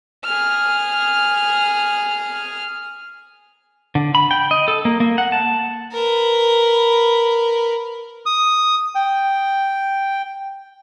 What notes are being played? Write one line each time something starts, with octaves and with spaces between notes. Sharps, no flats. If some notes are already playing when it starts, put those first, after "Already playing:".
G#4 F6
D3
B5
G5
D#5
A4
A#3
A#3
F#5
A5
A#4 B4
D#6
G5